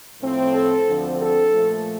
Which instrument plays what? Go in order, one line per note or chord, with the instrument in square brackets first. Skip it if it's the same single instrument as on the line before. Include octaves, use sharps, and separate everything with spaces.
[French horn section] A2 F3 A3 C4
A4
D2 D3 F3 C4
A4
A#2 F3 A3